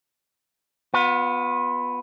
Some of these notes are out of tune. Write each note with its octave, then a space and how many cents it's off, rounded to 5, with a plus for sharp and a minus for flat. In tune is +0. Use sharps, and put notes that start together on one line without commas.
B3 +5 F4 +40